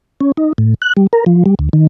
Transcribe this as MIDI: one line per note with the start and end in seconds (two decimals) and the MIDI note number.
0.21 0.32 61
0.37 0.53 63
0.58 0.74 45
0.82 0.93 90
0.97 1.07 55
1.13 1.24 70
1.26 1.44 53
1.46 1.55 55
1.59 1.69 38
1.73 1.87 51